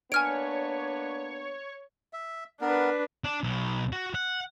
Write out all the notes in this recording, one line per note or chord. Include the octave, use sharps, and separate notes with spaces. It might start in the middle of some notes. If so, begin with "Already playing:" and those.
A#3 B3 D4 C#5 G#5 F6 D7
E5
B3 D4 A#4 B4
D4
B1 B2
F#4
F#5